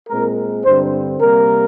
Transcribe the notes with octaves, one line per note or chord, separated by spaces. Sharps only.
A#2 G#3 C4 A#4
G2 D3 G3 C4 C5
C3 G3 A#3 A#4